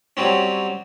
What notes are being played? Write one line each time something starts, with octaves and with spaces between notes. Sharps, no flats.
F#3 G3 C4 C#4